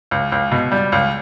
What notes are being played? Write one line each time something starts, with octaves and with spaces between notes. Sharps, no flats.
C#2
C#2
B2
G3
C#2